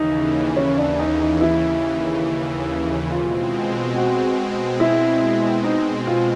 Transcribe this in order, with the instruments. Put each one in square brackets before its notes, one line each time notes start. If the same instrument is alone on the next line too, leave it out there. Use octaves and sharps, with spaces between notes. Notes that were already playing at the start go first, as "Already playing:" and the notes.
Already playing: [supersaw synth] D#2 C#3 E3 [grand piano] D#4
[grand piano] C#4
D4
D#4
D#4
E4
[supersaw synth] B2 G#3 C4 [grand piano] F4
[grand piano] F#4
E4
D#4
F4